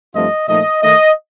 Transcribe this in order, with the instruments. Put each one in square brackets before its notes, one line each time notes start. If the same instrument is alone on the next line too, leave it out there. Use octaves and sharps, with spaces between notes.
[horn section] G2 F3 A3 C4 F4 D#5
A#2 F3 A3 D#4 D#5
D#3 A3 D#4 D#5